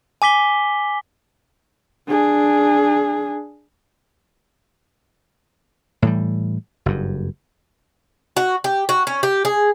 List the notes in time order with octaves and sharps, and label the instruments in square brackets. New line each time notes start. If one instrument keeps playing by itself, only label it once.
[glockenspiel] G#5 D6 B6 G7
[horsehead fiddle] D4 G#4
[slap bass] A2 E3 G3
F#1 G2
[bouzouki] F#4
G4
F#4
C#4
G4
G#4